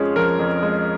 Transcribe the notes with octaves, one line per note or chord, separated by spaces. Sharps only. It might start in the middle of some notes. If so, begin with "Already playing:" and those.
Already playing: F2 F3 G#3 C#4 G#4
F3 A#4
F2
G#3